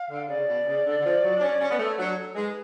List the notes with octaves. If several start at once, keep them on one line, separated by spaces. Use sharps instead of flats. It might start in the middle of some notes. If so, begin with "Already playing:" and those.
Already playing: F5
D3
C#3 D5
B2
C#3
D3
D3
F3
F#3
D4
C#4
C#4
B3
A3 C#5
F#3 D4
A4
G#3 B4